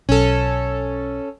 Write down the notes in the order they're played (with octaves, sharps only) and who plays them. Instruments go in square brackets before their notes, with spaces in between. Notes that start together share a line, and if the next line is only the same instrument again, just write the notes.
[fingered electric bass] B1 [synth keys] C#4 A4